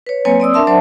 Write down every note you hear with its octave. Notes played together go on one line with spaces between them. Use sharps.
B4 C#5
F#3 A#3 C4 B4 C#5 G#5
C4 D5 D#6 E6
D4 A#4 E5 A5 C6
F#3 C5 D5 E5 F#5 A5